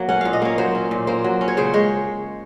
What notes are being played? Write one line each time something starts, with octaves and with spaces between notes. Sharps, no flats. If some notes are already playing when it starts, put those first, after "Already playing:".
Already playing: F#3 A#3
C#4 F#5
A#2 F5
D#5
A#3 C#5
F#3 C5
C#4
A#2
A#3 C5
F#3
C#4
C#5
C#3 C5
G#3 C#5